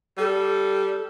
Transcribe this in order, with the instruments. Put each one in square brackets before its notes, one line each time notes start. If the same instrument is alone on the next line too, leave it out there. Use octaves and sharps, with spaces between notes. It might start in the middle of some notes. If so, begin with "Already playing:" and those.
[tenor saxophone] G3 [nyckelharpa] A4